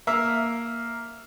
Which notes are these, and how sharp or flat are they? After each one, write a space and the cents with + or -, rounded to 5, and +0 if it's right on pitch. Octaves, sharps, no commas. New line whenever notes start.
A#3 +0 E5 +0